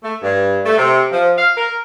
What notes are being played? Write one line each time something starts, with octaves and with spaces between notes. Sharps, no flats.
A3
G2
A3
C3
F3
F5
A#4